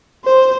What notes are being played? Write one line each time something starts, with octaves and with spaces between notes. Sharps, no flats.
C5